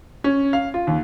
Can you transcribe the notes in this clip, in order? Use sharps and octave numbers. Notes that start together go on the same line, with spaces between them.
C#4
F5
F4
D#2